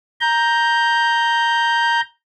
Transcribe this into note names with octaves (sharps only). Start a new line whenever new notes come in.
A#5 G6